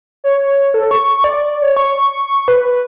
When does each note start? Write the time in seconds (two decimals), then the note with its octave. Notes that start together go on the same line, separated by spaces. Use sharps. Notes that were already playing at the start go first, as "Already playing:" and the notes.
0.24 C#5
0.74 A4
0.91 C#6
1.24 D5
1.43 D5
1.62 C#5
1.77 C#6
2.48 B4